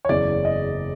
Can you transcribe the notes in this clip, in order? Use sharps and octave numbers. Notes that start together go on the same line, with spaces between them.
C#5
F#1 E2 C#3 D5
D#5